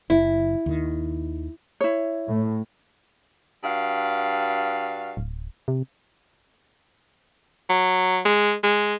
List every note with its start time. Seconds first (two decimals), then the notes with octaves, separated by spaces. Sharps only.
0.10 F#1 E4
0.66 D#2 D#3
1.81 E4 C#5
2.28 A2
3.64 G2 F#4 F5
5.17 D1
5.68 C3
7.70 F#3
8.25 G#3
8.64 G#3